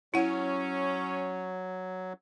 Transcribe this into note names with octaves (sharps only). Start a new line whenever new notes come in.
F#3 C#4 E4 F#5